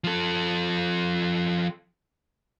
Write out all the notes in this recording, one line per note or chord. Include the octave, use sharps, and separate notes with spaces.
F3 A4